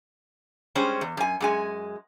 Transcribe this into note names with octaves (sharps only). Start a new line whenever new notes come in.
G3 G#3 C#4 C5
E2
F#2 G#5
F#2 G#3 G#5